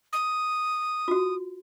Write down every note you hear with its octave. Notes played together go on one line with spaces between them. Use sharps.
D#6
F4 F#4